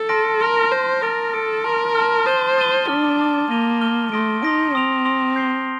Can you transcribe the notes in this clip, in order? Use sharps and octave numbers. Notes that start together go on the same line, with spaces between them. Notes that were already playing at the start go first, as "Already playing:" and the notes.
Already playing: A4
A5 C6 F6 A#6 D7
A#4 C6 F6 A#6
C5 C6 F6 A#6
A#4 D#6 A6 D7
A4 D#6 A6 D7
A#4 A5 C6 F6
A5 C6 F6
C5 D#6 A6 D#7 G7
D#6 A6 D#7 G7
D4 A5 D6 F6
A5 D6 F6
A#3 F6 A#6 D#7 G7
F6 A#6 D#7 G7
A3 C6 D#6 A#6 D7
D#4 C6 D#6 A#6 D7
C4 C6 D#6 A#6 D7 F7
C6 D#6 A#6 D7 F7
G6 C7 G7